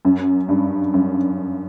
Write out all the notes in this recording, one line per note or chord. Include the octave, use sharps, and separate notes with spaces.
F#2
G2
F#2